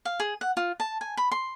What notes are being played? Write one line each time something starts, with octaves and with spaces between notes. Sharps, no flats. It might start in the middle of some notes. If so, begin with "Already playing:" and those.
F5
G#4
F#5
F4
A5
G#5
B5
C6